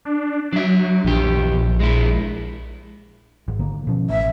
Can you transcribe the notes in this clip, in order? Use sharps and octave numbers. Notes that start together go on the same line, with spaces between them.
D4
F#3 D4 E5
A#1 E2 G4
G#3 E4
G#1
D3 D#3 A#3
B2 F3 C#4
A1 E5